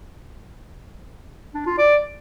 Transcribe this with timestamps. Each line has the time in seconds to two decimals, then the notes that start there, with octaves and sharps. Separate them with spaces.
1.55 D4
1.66 F4
1.78 D5